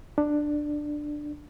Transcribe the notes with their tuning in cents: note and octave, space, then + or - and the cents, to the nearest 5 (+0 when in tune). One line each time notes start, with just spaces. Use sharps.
D4 +15